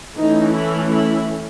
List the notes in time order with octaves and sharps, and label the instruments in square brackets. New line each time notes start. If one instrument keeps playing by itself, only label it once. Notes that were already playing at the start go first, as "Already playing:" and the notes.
[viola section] E3 A3 C#4 D#4
E4
E4